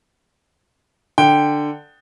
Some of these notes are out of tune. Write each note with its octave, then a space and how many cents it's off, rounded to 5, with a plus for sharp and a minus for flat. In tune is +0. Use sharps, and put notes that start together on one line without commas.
D3 +10 G5 +0